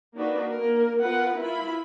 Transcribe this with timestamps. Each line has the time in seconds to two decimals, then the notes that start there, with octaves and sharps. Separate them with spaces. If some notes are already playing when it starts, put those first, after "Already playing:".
0.17 A#3 D4 D#4 F#4 B4
0.51 A#3 A#4
1.01 B3 F4 A#4 B4 F#5
1.37 E4 F4 B5